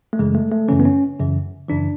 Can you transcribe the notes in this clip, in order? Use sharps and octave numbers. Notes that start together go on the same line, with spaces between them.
A3
F#2 C#3 E3 G#3
A3
A3
F#2 C#3 E3 C#4
B3
C#4
F#2 C#3 E3
F#2 C#3 E3 D4